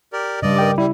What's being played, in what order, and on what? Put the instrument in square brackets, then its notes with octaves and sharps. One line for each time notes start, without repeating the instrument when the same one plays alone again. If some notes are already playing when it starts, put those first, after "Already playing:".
[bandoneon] G4 A#4 D5
[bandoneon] G2 D5 D#5 [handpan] C#3 G3
[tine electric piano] A#4 G5 D6
[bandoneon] G3 [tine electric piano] E4